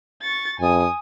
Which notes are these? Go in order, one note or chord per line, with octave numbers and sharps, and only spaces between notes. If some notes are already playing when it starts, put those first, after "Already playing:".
C#6 A6
F2 G#5 D#6